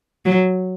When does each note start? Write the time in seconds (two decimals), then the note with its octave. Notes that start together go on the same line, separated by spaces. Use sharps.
0.26 F#3